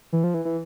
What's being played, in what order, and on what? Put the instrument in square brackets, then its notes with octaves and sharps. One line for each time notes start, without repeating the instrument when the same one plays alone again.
[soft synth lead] E3
F3
E3
E3